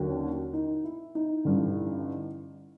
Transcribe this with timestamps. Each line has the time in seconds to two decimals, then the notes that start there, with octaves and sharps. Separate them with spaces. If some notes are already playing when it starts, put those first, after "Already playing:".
Already playing: D#2 D3 F#3
0.09 C#4
0.53 D#4
0.84 E4
1.15 D#4
1.45 A1 G2 D3